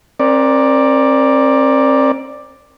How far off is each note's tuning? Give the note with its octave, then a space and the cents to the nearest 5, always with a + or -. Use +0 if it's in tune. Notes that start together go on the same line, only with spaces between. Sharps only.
C4 +40 A#4 +15 D5 +5